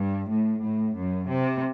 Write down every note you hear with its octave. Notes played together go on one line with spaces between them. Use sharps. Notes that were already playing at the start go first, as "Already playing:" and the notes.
Already playing: G2
A2
A2
F#2
C3